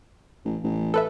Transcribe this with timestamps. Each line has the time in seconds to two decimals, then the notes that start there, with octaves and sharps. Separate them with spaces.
0.45 A1
0.63 A1
0.94 A4 B4 E5